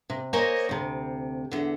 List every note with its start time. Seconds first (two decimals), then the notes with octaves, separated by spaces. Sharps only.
0.10 C3
0.33 A#3 C5 C#5 D#5 G#5
0.69 D2 C3
1.52 E2 D3